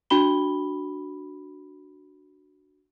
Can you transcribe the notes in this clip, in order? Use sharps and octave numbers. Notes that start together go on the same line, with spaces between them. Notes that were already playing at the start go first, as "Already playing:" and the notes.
D4 F#4 B5 G7